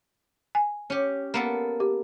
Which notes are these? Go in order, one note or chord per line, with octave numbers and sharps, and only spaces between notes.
G#5
C#4 G4
A#3 B3 A4
G4